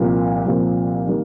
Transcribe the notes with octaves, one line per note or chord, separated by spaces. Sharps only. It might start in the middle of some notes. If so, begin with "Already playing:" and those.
Already playing: C2 A#2 F3 A#3
C2 A#2 F3 A#3
D#3 G3 A#3